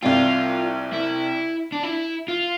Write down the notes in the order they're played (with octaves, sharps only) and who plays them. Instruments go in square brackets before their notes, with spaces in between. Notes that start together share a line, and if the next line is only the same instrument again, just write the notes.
[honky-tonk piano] C2 C3 G3 C4 [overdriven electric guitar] F4
[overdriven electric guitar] E4
D4
E4
F4